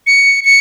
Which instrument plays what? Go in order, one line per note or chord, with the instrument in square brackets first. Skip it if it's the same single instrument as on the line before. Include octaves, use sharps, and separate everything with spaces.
[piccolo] C#7
C#7